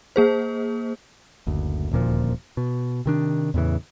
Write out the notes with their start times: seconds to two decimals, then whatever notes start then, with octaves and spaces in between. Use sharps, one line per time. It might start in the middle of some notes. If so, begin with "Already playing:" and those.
0.16 A#3 G#4 C5
1.47 F#1 D2
1.91 D#1 D2 A#2 F3
2.57 B2
3.06 C3 D#3 D4
3.54 E2 A2 C#3 E3